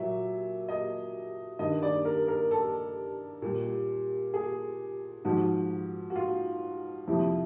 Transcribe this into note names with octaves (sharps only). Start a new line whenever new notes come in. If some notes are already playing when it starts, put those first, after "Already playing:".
Already playing: A#2 F#3 E5
D#5
G2 D#3 G3 D#5
D5
A#4
A#4
A4
A#2 G3
G#4
G#2 F3 F#4
F#4
F4
F2 C3 F3 E4